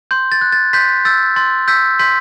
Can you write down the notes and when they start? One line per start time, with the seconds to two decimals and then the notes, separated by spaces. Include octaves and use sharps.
0.11 C6 G6
0.32 A6
0.41 F#6
0.52 A6
0.73 C6 G6 B6
1.05 E6 G6 A6
1.36 C6 A6
1.68 E6 G6 B6
1.99 C6 G6 B6